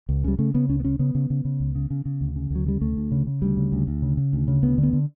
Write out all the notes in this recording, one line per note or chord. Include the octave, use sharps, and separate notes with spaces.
C#2
C#3 G3
C#3 A3
C#3 B3
C#2 C#4
B3
C#3 C#4
C#3 B3
C#3
C#3
C#3
C#2
C#3
C#3
C#3
D2
C#3
D2 F#3
C#3 G3
D2 A3
D2
C#3
C#3
D2 G3
C#3
D2
D2
C#3
C#3
D2
C#3
D2 B3
D3
B3
D3